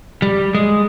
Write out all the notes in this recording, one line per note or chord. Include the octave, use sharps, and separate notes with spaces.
G3
G#3